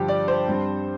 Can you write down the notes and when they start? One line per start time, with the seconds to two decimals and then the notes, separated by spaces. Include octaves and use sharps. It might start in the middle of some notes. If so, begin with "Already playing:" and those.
Already playing: G2 D3 F3 G4
0.08 D5
0.28 C5
0.48 G2 G3 C4